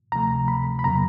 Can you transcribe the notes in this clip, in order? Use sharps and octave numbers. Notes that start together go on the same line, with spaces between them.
D2 C3 F3 A3 A#5
B5
B5
F2 C#3 F#3 A#3 A#5